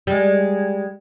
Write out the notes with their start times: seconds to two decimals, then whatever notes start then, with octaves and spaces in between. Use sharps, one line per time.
0.07 G3 G#3